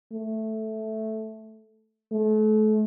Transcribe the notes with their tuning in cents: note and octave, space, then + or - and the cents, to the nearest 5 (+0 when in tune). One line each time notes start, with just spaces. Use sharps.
A3 -5
A3 -35